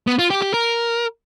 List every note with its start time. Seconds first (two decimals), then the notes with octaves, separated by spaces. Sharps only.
0.07 B3
0.19 F4
0.30 G4
0.42 G4
0.54 A#4